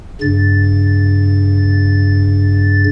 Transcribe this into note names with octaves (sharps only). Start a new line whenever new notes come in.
G2 C#3 A6